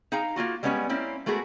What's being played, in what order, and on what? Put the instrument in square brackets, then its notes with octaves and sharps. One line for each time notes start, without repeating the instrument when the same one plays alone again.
[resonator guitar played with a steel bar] D#4 G#4 F5 G5 A#5
A#3 C#4 F4 F#4
G3 G#3 B3 C#4 D#5 G#5
A#3 C4 C#4 E4
G#3 A3 B3 F#4 G#4 A#4